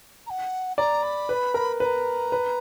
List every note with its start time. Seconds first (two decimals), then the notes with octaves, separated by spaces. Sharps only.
0.26 A#5
0.30 F#5
0.77 D5 A#5
1.03 B5
1.29 B4
1.54 A#4
1.80 B4 B5
1.85 A#5
2.32 B4